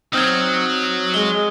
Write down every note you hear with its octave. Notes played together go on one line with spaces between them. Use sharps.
F#3 C4 D#4 D#6 F6 G#6
G#3 G7